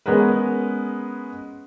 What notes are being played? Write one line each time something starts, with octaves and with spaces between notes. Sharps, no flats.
G#3 B3 C#4 G#4 A#4 B4